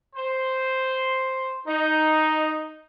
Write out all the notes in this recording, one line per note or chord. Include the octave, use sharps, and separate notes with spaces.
C5
D#4